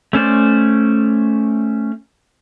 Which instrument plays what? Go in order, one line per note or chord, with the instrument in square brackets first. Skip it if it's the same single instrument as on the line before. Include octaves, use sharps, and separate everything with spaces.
[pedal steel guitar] A3 C#4 C5 D5